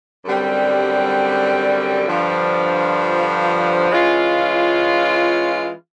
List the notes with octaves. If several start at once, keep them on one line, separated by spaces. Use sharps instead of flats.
F#2 D3 G3 C4
G2 D3 F3
E3 G#3 C#4 F4